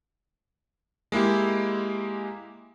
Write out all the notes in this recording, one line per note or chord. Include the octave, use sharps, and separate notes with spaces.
G#3 A#3 E4 G4